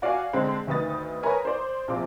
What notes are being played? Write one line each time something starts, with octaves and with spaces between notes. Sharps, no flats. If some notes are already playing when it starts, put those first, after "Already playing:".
F#4 D5 F5 F#5 G#5
D3 G#3 C4
D2 D#3 B4 D#6 A6
A#4 B4 C#5 G#5 A#5 B5
C5 D5
A#1 C3 F4 D6